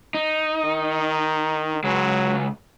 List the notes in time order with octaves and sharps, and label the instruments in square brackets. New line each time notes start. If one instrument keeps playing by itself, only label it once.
[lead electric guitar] D#4
[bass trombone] D#3
[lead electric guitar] C#2 G#3 [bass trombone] F#3